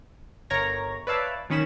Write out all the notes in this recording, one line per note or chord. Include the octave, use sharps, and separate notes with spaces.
G1 A#4 C#5 A#5 G#6 A#6
B4 C#5 D5 E5 F5 A5
B1 D#3 C#4 B5 E7